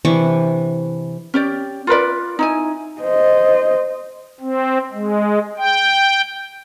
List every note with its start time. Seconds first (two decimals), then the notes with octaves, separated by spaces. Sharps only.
0.05 C3 E3 D4 C#6
1.34 C#4 G4 D5
1.87 F4 A#4 B4 D5
2.39 D#4 E4 G#5
3.01 C5 D#5
4.40 C4
4.92 G#3
5.58 G5